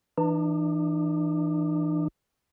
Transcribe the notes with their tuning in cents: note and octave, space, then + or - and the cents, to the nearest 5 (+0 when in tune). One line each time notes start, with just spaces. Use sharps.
E3 +0 D4 +40